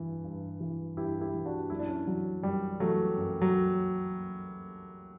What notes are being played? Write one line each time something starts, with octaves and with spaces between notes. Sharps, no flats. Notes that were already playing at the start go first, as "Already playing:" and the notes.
Already playing: G2 E3
G2
E3
G2 E4 G4
E4 G4
E3
D4 F#4
F#2 E4
D4
C#4 E4
E3 F#3
F#2 G3
E3 F#3 A3
F#2
F#3